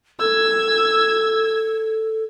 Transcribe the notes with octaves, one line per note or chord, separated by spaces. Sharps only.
A4 E6 G#6